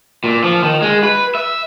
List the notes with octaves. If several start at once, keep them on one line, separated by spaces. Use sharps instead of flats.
A#2
F3
D#3
G#3
B4
E5